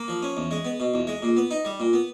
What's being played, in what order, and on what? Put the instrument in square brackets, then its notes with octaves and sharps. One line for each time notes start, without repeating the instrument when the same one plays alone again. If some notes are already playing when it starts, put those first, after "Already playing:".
Already playing: [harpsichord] A#3
F3
C#4
E2
G#3
B3
B2
E2
G#3
A#2
B3
D#4
G3
A#2
B3